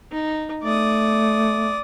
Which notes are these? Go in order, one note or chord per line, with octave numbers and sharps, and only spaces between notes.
D#4
A3 D5 D#6